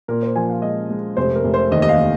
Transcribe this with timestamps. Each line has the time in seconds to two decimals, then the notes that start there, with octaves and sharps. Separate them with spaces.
0.08 A#2 A#4
0.23 C5
0.36 F3 G#5
0.50 F5
0.62 G#3 D#5
0.90 G#3
1.17 F1 C5
1.35 A#4
1.44 F1
1.54 C5
1.71 D#2 D#5
1.82 D#5
1.89 F5
1.98 D#3